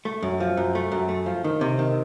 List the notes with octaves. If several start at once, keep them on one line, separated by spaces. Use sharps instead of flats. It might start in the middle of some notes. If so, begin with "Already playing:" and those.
A3
F#2
F3
F#2
A3
F#2
A3
F3
D#3
C3
D#3